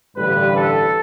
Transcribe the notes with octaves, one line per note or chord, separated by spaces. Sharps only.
A1 G2 D3 G3 B4
A4